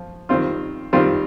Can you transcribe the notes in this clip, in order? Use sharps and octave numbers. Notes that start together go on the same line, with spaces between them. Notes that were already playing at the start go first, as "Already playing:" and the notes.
Already playing: F3
D#3 G3 C4 F4
D#3 G3 C4 F4